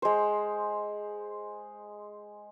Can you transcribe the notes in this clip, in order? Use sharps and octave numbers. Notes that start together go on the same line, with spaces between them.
G#3 C5